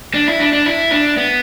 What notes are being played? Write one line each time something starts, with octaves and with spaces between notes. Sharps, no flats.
D4
E4
D4
D4
E4
D4
B3